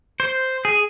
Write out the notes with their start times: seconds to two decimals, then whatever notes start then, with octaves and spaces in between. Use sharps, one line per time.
0.20 C5
0.65 G#4